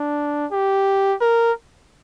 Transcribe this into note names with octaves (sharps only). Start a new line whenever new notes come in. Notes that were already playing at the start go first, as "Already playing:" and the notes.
Already playing: D4
G4
A#4